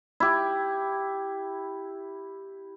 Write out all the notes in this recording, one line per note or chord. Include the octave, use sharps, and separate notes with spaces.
E4 G4